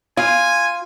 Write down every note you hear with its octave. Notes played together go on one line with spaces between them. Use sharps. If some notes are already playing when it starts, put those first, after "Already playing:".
F4 G#5